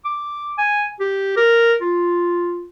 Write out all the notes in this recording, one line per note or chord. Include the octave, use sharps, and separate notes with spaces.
D6
G#5
G4
A#4
F4